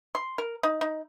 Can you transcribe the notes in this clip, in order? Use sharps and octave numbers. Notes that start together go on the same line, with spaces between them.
C6
A#4
D#4
D#4